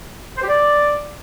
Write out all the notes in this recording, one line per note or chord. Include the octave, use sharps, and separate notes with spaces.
C5
G4
D5